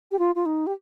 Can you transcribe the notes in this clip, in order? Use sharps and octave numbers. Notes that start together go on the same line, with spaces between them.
G4
F4
F4
D#4
G4